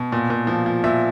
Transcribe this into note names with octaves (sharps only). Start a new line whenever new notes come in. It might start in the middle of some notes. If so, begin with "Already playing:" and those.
Already playing: B2
A#2
A#2
F3
F3
A#2 E5